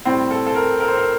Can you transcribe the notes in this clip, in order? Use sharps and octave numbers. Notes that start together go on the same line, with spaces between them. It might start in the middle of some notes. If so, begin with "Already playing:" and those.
A2 G3 C4
A4
A4
A#4
A#4
C5
A#4